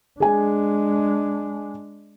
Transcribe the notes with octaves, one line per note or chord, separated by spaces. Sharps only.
G#3 D4 G#4 G#5